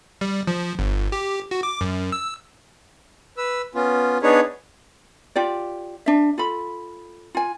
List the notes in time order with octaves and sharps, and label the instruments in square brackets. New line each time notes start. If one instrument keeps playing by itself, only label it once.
[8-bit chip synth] G3
F3
G1
G4
F#4
D6
F#2
E6
[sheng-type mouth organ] B4 E6
B3 C#4 F4
B3 D4 D#4 G#4 B4 C#5
[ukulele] F4 G4 D5
D4 E5
F4 A4 B5
F4 G#5